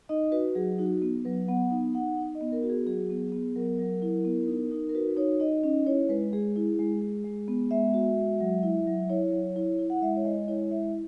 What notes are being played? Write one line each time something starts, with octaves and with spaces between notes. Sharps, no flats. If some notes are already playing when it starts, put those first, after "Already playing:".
D#4 D#5
F#4 B4
F#3 G#4
D#4 F#4
B3
F#3 B4
B3 F#5
D#4
D#4 F#5
D#4
D#5
B3
A#4
F#4
G#4
F#3 G#4
B3
B3
F#3 A#4
F#3
E4
B3
D#4
D#4
A#4
F#4 B4
D#4 C#5
D#4 D#5
C#4 D#5
E4 C#5
G#3 B4
G#3 G#4
E4
G#3
G#3
G#3
B3
G#3 E5
F#4
G#3
F#3
E4
F#3
E4 C#5
F#3
E4
E4
F#5
G#3 E5
C#5
G#3 D#5
E4 C#5
G#3 E5